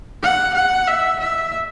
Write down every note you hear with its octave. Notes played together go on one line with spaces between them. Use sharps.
F#5
F#5
E5
E5